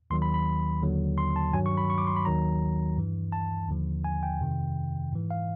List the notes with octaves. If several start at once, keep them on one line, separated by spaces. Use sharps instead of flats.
D#2 D#3 F#3 C6
B5
B5
D#2 D3 F#3
C6
A5
G2 D#3 F#3 G#5
C#6
B5
C#6
D6
C6
B5
D#2 D#3 F#3 A#5
G2 E3
A5
D#2 D3 F3
G#5
G5
F2 C3 D#3
G#2 E3
F5